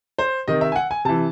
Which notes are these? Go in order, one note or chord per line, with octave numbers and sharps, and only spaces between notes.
C5
C3 D#3 D#5
E5
G#5
F#5
G#5
C3 E3 A5